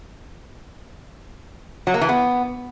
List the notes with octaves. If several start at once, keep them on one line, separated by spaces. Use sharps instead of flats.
F#3
A#3
E3
B3